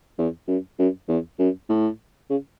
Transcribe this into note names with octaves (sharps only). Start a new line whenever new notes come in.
E2
F#2
F#2
E2
F#2
A2
C#3